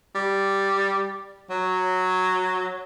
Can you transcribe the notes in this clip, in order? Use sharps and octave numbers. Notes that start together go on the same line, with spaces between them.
G3
F#3